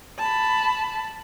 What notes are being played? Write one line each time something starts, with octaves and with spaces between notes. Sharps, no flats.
A5 B5